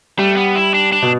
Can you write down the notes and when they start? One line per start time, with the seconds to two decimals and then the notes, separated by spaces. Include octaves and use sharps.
0.18 G3 A3
0.36 B3
0.56 E4
0.74 D4
0.92 D4
1.02 B2